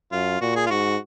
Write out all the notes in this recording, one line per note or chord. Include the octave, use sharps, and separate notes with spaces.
F#2 F4
A#2 F#4
G#4
F4
G#2 F#4